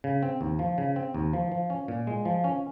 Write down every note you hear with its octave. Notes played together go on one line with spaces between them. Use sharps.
C#3
C4
D#2
F3
C#3
C4
D#2
F3
F3
C#4
A#2
G#3
F3
C#4